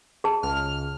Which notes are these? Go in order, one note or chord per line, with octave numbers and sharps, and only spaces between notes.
G#4 A5
C#2 F6